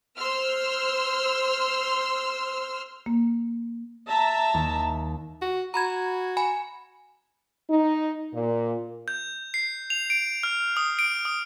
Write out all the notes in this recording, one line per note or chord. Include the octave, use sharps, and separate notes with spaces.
C5 C6 E6 F6
A#3
E5 A5 A#5
D#2
F#4
F#4 A#5 B5 G#6
G#5 B5
D#4
A#2
G6
C7
F7
D7
F6
D#6
D7
D#6